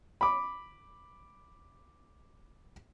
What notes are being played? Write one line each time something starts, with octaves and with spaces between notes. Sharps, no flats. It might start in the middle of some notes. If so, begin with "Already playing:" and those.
B5 D6